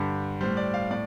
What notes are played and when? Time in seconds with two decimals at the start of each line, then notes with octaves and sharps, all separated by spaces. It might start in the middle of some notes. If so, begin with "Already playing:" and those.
Already playing: G2 D3 G3 G4
0.41 A2 G3 C5
0.57 D5
0.74 F5
0.91 A2 D5